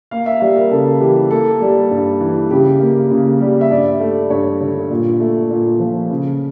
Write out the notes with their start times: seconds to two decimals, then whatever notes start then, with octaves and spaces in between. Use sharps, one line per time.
0.11 A#3 F5
0.26 E5
0.41 G3 E5
0.56 A#4
0.71 C#3 A4
1.01 E3 G4
1.31 A#3 A4
1.62 G3
1.91 G2
2.21 E3
2.50 C#3 G4
2.80 A#3
3.11 C#3
3.41 G3
3.61 E5
3.71 G2 D5
4.00 A3
4.30 G2 C#5
4.61 D3
4.90 A#2
5.20 A3
5.50 A#2
5.80 F3
6.10 C#3